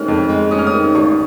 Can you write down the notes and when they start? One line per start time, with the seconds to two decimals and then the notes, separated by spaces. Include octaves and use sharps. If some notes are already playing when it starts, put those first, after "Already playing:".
Already playing: D#3 G#3 C#4 F6 F#6
0.08 F2
0.29 G#3
0.51 C#4 D#6
0.59 F6
0.67 D#6
0.74 D#3
0.95 G#1 C#6